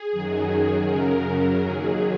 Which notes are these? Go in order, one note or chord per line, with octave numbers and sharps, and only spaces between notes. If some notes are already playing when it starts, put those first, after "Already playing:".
Already playing: G#4
F#2 D#3 F#3
F#2 C#3 F#3 A#4
A#4
D#2 D#3 F#3 G#4